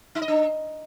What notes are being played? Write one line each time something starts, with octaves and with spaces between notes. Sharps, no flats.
D#4
D#5
D4